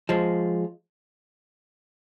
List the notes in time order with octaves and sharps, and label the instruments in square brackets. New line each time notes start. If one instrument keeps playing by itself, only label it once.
[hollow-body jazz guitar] F3 G#3